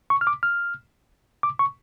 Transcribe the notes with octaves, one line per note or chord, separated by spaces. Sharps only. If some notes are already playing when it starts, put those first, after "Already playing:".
C#6
F6
D6
F6
D6
C#6